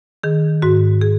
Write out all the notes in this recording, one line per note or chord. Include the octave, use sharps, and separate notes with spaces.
D#3 G#4
G#2 F#4
G#4